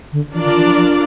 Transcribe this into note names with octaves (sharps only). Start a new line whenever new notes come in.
D3
E3 D4 F4 A#4 D5
D3
E3
F3
F3